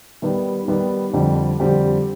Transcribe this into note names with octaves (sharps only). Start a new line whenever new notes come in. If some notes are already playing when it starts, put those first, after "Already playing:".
D#3 G3 B3
D#3 G3 B3
F2 D3 G3 C4 G4
F2 D3 G3 C4 G4